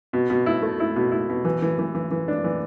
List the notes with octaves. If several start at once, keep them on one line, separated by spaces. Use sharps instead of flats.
B2
B2
E4
A3
E4
B2
E4
B2
E3
E3
E3
E3
E3
D4
E3